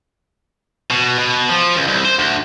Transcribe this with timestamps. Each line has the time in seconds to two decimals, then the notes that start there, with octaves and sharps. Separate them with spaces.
0.90 B2
1.18 B2
1.49 F3
1.76 C#2
1.87 C2
2.05 C5
2.19 D2